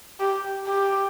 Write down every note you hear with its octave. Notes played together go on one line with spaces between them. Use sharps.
G4
G4